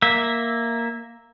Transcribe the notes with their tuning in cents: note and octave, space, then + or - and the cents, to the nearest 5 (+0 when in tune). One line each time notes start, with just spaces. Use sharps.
A#3 +0 E5 +0